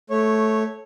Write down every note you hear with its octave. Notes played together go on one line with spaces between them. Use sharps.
A3 C#5